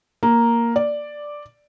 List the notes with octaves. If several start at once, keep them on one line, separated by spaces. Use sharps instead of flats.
A#3
D5